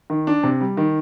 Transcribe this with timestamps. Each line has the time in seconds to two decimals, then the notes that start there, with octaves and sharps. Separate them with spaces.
0.10 D#3
0.27 D4
0.43 C3
0.61 G3
0.77 D#3